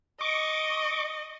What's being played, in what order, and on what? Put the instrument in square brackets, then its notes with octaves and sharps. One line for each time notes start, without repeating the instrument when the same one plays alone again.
[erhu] D#5 [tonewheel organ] C#6 D6